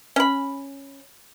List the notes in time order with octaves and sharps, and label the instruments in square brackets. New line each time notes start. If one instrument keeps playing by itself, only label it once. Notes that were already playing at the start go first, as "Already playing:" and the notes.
[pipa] C#4 B5